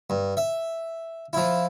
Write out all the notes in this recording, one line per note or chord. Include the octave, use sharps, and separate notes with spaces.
G2
E5
F3 E4